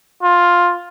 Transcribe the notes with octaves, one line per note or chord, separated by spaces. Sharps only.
F4